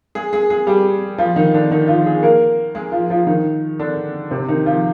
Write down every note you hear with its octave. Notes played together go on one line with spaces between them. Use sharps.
G#3 G#4
G#3 G#4
G#3 G#4
G3 G4
F3 F4
D#3 D#4
D3 D4
D#3 D#4
F3 F4
G#3 G#4
A#3 A#4
G#3 G#4
F3 F4
F3 F4
D#3 D#4
D3 D4
C3 C4
D#3 D#4
F3 F4